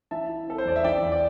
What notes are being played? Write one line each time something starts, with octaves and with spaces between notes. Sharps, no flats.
E3 E5 A5
E4
C4 A4
C5
E2 D5
E5
E3 D5 G5
E2
D5